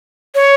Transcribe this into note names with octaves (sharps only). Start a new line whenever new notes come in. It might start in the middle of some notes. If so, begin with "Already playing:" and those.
C#5